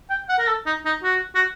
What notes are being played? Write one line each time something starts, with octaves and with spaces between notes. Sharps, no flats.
G5
F#5
A#4
A4
D#4
D#4
F#4
F#4